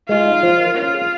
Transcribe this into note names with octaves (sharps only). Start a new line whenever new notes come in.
G#3 F4
D#4
F3
A#4
C#4 F4
G#4